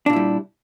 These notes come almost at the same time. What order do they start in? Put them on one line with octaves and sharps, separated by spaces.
D4 A#2 E4 G3